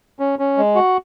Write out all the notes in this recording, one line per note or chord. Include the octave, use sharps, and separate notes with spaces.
C#4
C#4
G#3
F#4